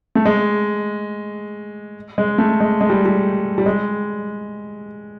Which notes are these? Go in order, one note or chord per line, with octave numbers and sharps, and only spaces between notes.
A3
G#3
G#3
A3
G#3
G#3
G3
G3
G3
G#3